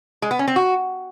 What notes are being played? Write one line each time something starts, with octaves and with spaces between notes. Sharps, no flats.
G#3
B3
C#4
C4
F#4